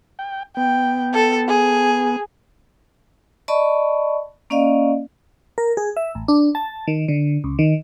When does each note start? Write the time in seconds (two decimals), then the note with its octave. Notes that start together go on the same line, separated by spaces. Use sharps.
0.19 G5
0.57 B3 G5
1.14 A4
1.48 G#4
3.48 D5 D#5 A5 B5 C#6
4.50 A#3 C#4 D5 D#5 F5
5.58 A#4
5.77 G#4
5.97 E5
6.15 A1
6.28 D4
6.55 A5
6.87 D#3
7.08 D3
7.44 C#2
7.59 D#3